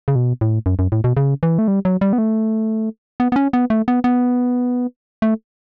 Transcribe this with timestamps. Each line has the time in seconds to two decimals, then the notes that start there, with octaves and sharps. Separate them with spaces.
0.08 C#3
0.15 B2
0.41 A2
0.66 F#2
0.79 F#2
0.92 A2
1.04 B2
1.17 C#3
1.43 E3
1.59 A3
1.68 G3
1.85 F#3
2.01 G3
2.13 B3
2.18 A3
3.20 B3
3.32 B3
3.36 C#4
3.53 B3
3.70 A3
3.88 B3
4.04 B3
5.22 A3